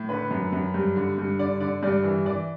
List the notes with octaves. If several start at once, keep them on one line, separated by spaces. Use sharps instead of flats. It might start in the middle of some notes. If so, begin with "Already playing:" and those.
Already playing: A2
D3 B4
F#2
F#2
G2
D3
G2
D3 D5
D3 D5
G2 D5
E3
E3 D5